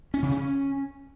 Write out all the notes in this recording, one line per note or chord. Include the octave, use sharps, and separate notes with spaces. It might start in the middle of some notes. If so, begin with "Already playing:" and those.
C#4
C#3
C#4